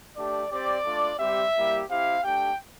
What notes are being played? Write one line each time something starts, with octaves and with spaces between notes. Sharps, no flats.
A3 D4 G4 D5
C4 G4 D5
A3 D4 F4
G3 C4 G4 E5
G3 A#3 E4 G4
C4 E4 G4 F5
A3 D4 G4 G5